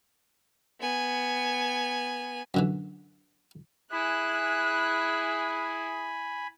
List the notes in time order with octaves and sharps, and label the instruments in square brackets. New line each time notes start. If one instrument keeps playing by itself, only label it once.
[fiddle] B3 G#5
[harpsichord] F#2 D3 E3
[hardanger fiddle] E4 [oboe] G#4 [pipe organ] G#5 B5 [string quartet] F#6